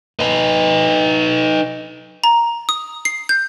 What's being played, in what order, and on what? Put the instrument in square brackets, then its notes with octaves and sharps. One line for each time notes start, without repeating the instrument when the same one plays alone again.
[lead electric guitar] D#4 B4
[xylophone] A#5
D#6
C7
G6